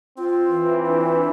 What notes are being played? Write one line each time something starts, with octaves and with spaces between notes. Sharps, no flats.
C4 F4
E3
D4